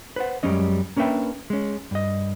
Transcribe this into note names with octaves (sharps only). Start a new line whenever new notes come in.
B4 C5 F#5
F#2 G3 G#3 C#4 D#5
A#3 C#4 D4 B4 E5 G5
G#3 C#4
G2 D#5